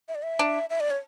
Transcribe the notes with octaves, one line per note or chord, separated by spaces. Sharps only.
E5
D5
E5
D4
E5
D5
C#5